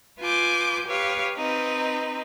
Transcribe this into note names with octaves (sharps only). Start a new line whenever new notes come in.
F4 B4 G#5 D6 G6
G4 B4 C#5 F5
C4 D#4 B4